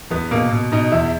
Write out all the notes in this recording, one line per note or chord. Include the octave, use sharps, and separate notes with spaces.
E2 B3
B2 A#3
B2
B2 D#4
E2 E4